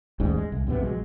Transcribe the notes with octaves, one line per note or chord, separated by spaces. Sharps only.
A1 D#2 G#2 G3
G#3
C2
B1 F#2 C3 B3
A#1 F#3 G#3